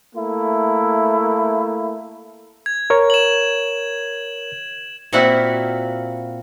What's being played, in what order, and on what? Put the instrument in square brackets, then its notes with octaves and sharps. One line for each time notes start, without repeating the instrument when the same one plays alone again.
[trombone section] A3 A#3 E4
[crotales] G#6
[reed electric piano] A#4 C#5
[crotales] E7 F#7
[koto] A#2 A#3 C4 E4 F#4 F#5